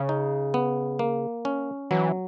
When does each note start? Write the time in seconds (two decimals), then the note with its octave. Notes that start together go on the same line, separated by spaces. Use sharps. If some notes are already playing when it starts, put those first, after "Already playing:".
Already playing: C#3
0.09 D#4
0.54 B3
0.99 A#3
1.45 C#4
1.91 E3 F#3